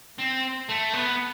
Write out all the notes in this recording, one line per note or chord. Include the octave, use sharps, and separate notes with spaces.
C4
A3
B3